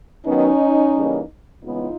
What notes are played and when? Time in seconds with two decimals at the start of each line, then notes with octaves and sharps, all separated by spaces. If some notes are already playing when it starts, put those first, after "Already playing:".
0.25 D#3 F#3 B3 C#4 D#4
0.94 C#3 E3 G3 A#3
1.63 C#3 E3 G#3 B3 D#4 F4